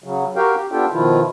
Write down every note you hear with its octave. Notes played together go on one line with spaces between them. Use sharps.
C#3 F#3
F#4 G4 A#4 F5 G5
G4
B3 D4 F4 G4 A4 G5
B2 D#3 F3 E4 F4